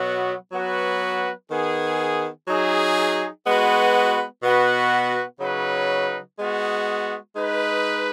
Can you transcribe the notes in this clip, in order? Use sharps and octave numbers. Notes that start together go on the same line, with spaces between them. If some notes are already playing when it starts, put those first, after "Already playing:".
Already playing: B2 F#3 B3 F#4
F#3 B3 F#4 B4
D#3 B3 G#4
F#3 D#4 G#4
G#3 B3 F#4 B4
B2 B3 F#4 B4
C#3 F#3 D#4 B4
G#3 B3 F#4
G#3 D#4 B4